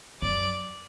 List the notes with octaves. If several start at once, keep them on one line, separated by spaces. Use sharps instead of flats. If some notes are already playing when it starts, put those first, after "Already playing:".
F#2 D5